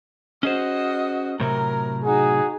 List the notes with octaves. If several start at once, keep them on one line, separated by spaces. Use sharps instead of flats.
C#4 F#4 G#4 C5 D#5
A2 C3 F#3 A#4
D#4 F#4 G#4